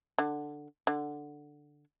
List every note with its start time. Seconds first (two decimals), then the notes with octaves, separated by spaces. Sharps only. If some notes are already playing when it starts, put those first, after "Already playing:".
0.18 D3
0.87 D3